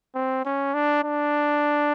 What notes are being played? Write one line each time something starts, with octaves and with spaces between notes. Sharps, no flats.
C4
C#4
D4
D4